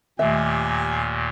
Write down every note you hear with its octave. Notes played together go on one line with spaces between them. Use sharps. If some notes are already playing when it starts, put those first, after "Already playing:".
D#2 A#2 D#3 A3 G4 E5 G#5